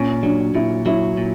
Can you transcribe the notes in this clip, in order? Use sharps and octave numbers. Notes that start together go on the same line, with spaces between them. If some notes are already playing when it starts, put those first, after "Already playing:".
Already playing: A#2 C#4
F#3 D4
A#2 E4
F#3 E4
A#2